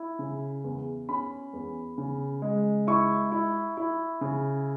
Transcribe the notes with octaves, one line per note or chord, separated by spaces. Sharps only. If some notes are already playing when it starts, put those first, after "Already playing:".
Already playing: E4
C#3
E2
C#4 B5
E2
C#3
G#3
E4 C#6
E4
E4
C#3